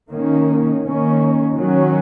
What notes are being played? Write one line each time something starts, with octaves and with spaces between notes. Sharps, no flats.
D#3 A#3 C#4
D#3 A#3 C#4
D#3 F#3 C#4